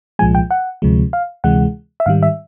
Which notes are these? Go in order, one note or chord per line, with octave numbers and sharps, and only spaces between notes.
C2 A#2 F3 G#3 G#5
G5
F#5
D2 C3 F3 G#3
F5
D2 C3 E3 G#3 F#5
E5
G#2 D#3 G3 F5
E5